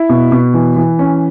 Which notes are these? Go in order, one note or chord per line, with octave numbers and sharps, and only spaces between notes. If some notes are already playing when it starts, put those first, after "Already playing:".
Already playing: E4
B2
B2
E3
E3
C#4